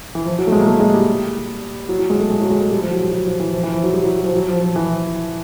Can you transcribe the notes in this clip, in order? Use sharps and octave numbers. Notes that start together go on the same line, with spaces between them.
E3
F3
F#3
A3
G#3
A#3
A3
G#3
G3
F#3
F#3
G#3
A3
G#3
F#3
G#3
A3
G3
F3
F#3
G3
F#3
F3
E3
F3
E3
F3
F#3
G3
F#3
F3
F#3
F3
F3
E3